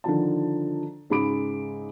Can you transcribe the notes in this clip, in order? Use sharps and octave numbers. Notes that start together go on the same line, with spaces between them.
D3 D#3 F3 A5
G#2 C#3 G#3 B5 D6 D7